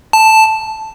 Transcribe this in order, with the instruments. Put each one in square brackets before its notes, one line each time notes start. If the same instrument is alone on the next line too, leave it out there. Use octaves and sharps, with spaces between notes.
[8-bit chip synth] A5